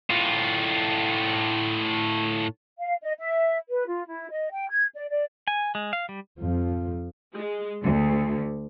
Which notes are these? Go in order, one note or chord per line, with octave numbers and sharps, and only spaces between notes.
A2 F4
F5
D#5
E5
B4
F4
E4
D#5
G5
G#6
D5
D5
G#5
G#3
F5
G3
F2 F3
G#3
D2